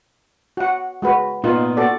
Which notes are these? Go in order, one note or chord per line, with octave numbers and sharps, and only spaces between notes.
F#4 F#5
G#3 F#4 B4
A#2 B3 D#4 F4 A#4
F#4 A4 D5